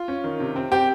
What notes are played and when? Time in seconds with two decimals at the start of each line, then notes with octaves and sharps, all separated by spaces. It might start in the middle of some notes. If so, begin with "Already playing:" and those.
Already playing: F4
0.08 C#4
0.24 D#3
0.40 C3
0.56 C4
0.72 C4 G4